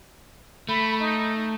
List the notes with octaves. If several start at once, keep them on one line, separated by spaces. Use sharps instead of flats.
A3 B5
D#4